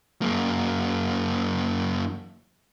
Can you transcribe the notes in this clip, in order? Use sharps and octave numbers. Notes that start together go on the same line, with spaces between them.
F#2 A#3